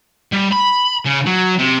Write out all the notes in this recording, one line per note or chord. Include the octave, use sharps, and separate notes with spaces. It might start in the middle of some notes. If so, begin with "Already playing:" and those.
G3
B5
C#3
F#3
C3